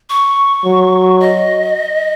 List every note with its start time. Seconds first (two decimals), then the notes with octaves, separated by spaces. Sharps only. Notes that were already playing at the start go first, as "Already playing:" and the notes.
0.10 C#6
0.65 F#3
1.20 D#5